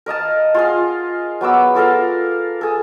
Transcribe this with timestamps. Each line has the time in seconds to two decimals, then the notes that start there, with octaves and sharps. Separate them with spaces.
0.06 A#4 D#5 F5 A5
0.54 F4 G#4 F5
1.41 F#3 B3 D6 E6
1.75 F4 A4 A#4 F5
2.61 G#4 A4